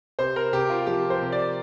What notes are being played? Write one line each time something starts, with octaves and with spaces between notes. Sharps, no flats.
C3 C5
A#4
C3 G4
F4
F3 G4
C5
C3
D5